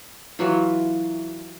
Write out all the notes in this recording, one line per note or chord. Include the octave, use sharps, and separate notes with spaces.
E3 F#3 F4